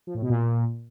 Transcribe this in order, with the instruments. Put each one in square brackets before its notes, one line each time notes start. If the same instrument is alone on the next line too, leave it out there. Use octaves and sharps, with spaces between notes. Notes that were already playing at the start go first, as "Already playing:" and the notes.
[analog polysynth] F3
A2
B2
A#2